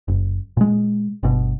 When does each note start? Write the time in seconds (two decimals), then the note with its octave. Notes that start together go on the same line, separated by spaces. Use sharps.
0.08 F#1
0.57 A#2 G#3
1.23 G1 B2